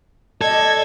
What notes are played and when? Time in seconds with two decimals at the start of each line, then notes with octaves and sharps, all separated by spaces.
0.41 A4 D5 D#5 G#6